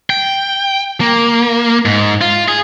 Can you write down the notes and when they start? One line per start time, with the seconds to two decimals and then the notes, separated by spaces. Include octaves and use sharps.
0.10 G5
1.01 A#3
1.85 G#2
2.21 F4
2.48 G#4